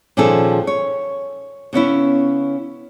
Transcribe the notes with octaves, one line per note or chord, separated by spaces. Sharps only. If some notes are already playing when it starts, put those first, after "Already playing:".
A#2 D#3 F3 C#4 G#4 A4
C#5
C#3 B3 C#4 E4